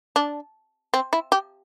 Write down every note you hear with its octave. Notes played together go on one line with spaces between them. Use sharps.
D4
C4
E4
G4